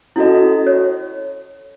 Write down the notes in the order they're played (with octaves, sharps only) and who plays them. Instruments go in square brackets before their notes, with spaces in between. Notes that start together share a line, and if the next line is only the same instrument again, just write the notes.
[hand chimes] C#4 F#4 A4 D#5 [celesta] E4
[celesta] C#5